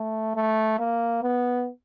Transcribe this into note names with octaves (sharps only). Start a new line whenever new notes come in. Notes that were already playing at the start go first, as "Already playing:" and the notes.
Already playing: A3
A3
A#3
B3